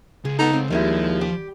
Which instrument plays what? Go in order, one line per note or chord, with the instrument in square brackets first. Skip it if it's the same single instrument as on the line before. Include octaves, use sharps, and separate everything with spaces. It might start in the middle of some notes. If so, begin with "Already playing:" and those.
[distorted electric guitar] C#2 [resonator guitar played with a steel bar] G#4
[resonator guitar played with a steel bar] B3 A4 [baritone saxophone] D#4
[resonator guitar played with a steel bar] C4
[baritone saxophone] D#2 [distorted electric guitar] F3 [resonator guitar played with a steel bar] G3 G#3 E4
[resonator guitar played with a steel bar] G4